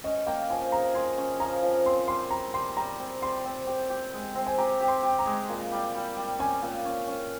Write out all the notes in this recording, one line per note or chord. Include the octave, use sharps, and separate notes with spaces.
C#4 D#5
A#3 G5
F3 G#5
G#4 A#5
G#4 C6
C#4
F3 A#5
F3
C4 C6
G3 C6
G3 A#5
G3 C6
G3 A#5
C4
G3 C6
C4
G4
G4
G#3
C4
G#5
G4 A#5
G4
C6
G4
A#5
G#3
A#2
G3
G3
G3
C#4 G#5
A#2
C#4
C#4